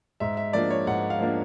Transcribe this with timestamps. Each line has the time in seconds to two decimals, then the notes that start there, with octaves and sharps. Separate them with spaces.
0.20 G#2 E5
0.37 E5
0.53 F3 A#3 D4 D5
0.70 C#5
0.87 G#2 F#5
1.10 F5
1.20 F3 A#3 D4